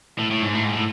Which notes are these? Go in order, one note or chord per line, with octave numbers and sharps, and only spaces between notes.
A2
A2
G#2
A2
G#2
A2